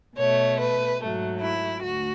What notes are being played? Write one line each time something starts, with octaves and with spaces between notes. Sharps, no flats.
B2 A3 C#5
B4
G#2 F#3 A3
E4
D2 F#4